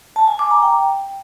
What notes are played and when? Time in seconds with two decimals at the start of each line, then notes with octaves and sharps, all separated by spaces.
0.16 A5
0.28 G#5
0.39 D6
0.51 A#5
0.62 G5